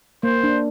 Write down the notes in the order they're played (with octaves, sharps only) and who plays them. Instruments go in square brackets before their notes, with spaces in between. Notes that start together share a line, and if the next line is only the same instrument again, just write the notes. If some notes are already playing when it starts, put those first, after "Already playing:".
[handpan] A#3 [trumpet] C5
[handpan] D4